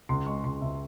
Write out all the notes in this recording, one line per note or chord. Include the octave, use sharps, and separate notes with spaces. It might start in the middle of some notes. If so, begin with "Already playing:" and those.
C#2 C6
G#3 C#6
C#2 C6
C#2 E5